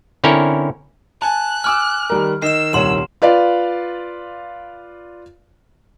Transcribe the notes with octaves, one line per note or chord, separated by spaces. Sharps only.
D3 C4 C#4 E4 A#4 C#5
G#5 A5 F#6
G#5 D6 E6 F6
D#3 G3 A#4
D#3 D#5 E6 C7 E7
D#1 C2 C#5 C6 E7
F4 B4 D5 F5